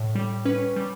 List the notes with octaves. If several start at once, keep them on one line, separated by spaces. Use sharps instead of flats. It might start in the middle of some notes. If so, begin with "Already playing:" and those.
Already playing: A2
G3
C#4 B4
G3